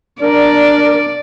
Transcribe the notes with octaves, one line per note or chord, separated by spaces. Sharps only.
D4 A#4 D5